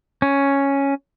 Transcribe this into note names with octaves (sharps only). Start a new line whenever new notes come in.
C#4